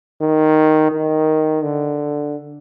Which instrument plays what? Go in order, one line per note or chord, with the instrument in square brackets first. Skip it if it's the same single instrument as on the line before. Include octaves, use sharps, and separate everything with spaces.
[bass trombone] D#3
D#3
D3